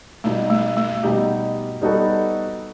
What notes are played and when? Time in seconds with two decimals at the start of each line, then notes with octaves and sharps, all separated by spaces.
0.24 B2 G3 A3 D#4 G4
0.50 A3
0.77 A3
1.03 B2 G3 D#4 G4
1.81 G3 B3 D#4 F#4 A4